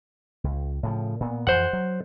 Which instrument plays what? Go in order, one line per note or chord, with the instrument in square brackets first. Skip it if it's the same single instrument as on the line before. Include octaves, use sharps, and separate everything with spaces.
[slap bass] C#2
A2 C#3 F3
A#2 B3
[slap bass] F2 E3 [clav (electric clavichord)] C5 F#5
[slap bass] F#3